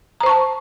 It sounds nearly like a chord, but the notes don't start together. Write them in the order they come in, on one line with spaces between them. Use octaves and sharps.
A#5 C5 C#6 A5